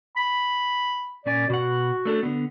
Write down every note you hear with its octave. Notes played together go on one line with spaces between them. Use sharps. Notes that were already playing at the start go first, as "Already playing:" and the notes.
B5
A#2 C#4 D5 G#5
B2 F#4 F#5
A3 D4 A4
D3 B3